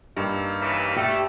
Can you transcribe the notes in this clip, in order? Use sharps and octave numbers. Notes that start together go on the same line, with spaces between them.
G2 A#3 D#4 E6
C#3 E3
A3 G4